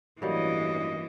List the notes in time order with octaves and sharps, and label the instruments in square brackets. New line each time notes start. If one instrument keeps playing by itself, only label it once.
[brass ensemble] A1 G2 D#5 [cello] E3 [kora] F#3 G3 A#3